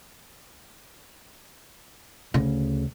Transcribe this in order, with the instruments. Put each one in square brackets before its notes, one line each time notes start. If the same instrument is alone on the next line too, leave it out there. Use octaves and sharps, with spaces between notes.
[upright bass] D2 C#3